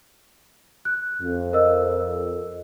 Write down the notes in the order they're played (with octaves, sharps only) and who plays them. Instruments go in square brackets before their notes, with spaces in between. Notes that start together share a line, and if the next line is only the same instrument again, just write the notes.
[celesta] F#6
[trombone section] F2
[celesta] A#4 D#5 E6